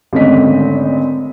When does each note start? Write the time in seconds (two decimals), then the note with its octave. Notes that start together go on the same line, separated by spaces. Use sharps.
0.13 G#1 D3 A3 C#4 D#5 B6